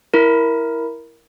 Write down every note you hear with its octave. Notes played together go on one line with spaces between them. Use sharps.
E4 A#4